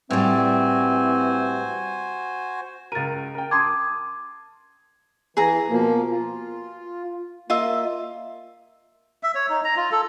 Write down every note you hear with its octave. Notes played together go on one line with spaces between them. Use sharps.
A2 E3 G3 C4 F#4 C5 G#5
C#2 A#4 A6 D#7
A#4 G5
A5 C6 D6 D#6 G#6
E3 G#4 A#5
B2 F3 A#3
F4
A#3 F4 D#5 E5
E5
C#5
D#4
A#5
F4
A4